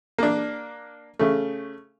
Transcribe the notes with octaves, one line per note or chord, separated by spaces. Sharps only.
A#3 D4
C#3 A3